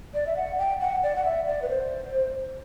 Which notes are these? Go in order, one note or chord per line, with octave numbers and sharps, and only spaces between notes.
D5
E5
F#5
G5
F#5
D5
F#5
E5
D5
B4
C5